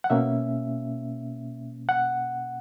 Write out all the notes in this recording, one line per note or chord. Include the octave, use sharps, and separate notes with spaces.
F#5
B2 A#3 C#4 E5
F#5